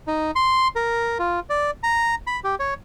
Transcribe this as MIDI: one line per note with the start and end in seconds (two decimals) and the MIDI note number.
0.07 0.31 63
0.35 0.68 84
0.76 1.18 70
1.19 1.40 65
1.50 1.71 74
1.83 2.15 82
2.27 2.40 83
2.44 2.55 67
2.60 2.74 73